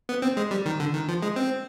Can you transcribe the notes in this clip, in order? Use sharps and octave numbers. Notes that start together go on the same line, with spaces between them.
B3
C4
G#3
G3
D#3
D3
D#3
F3
G#3
C4